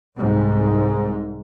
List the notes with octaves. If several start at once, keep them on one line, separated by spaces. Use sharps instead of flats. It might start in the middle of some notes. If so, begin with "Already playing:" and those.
C2 G#2